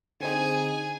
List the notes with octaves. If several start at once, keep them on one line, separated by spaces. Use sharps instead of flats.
D3 C4 D#4 G#4 G#5